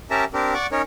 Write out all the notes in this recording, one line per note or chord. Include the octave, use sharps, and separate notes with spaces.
C#4 G4 A#4 E5 A5 A#5
C4 D4 G4 A#4
D5 F#5 C#6 D6
C#4 D#4 A#4 C#5